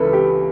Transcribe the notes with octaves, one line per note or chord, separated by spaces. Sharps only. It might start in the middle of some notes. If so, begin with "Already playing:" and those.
Already playing: C#2 C#3 E3 A4 B4
G4